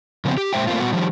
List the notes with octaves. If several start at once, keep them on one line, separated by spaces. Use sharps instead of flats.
C#3 F3 G3 B3 C4
G4
A#2 G3 G#3 C5 E5 G5
A3 A#3 C4 F4
A#2 G3 B3 F#4 F#5
D#3 F3 G3